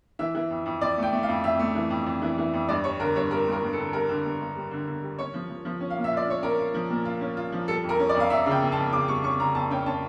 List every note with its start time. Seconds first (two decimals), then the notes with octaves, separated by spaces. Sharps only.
0.19 E3 E5
0.35 E3
0.50 F2
0.66 F2
0.81 F2 D5
0.98 A3
1.03 G5
1.13 A3
1.23 F5
1.28 F2
1.43 F2 E5
1.59 A3
1.75 E3
1.90 F2
2.06 F2
2.22 E3
2.38 E3
2.53 F2
2.69 G2 D5
2.84 G3 C#5
3.00 D3 A#4
3.15 G2 C#5
3.31 G3 A#4
3.47 G2
3.52 A#4
3.63 G2
3.73 A4
3.78 D3
3.93 G3 A#4
4.09 D3
4.25 G2
4.40 G2
4.56 G3
4.71 D3
4.87 D3
5.02 G3
5.18 C#4 C#5
5.34 F3
5.49 F3
5.65 F3
5.81 C#4
5.90 F5
5.97 A#2
6.04 E5
6.12 F4 D5
6.27 C#4 C#5
6.43 C#4 A#4
6.59 F4
6.74 F3
6.90 A#2
7.05 F4
7.21 C#4
7.37 F4
7.52 F3
7.68 G3 A4
7.84 F2
7.89 A#4
7.99 C#4
8.09 D5
8.15 F2
8.20 F5
8.30 F2 E5
8.46 C#3
8.51 G5
8.62 F2
8.72 A5
8.77 F2
8.92 C#3 D6
9.08 G3 C#6
9.24 C#4 C#6
9.39 C#3 A#5
9.55 F2 A5
9.71 C#4 G5
9.86 C#4 A5